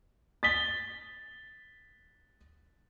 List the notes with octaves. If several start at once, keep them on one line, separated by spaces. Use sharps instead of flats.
A6 B6 G7